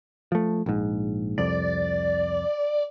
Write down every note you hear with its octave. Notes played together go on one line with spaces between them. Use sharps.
F3 A3
A#1 G#2
C2 F2 D5